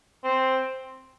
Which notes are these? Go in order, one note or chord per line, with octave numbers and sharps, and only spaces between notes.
C4